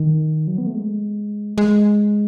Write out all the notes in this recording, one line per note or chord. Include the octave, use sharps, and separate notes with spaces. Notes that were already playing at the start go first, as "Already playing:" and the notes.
Already playing: D#3
F#3
B3
A3
G#3
G#3